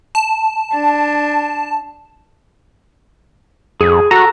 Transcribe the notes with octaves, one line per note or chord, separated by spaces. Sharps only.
A5
D4
F2 G#4
F#4 A4 A#5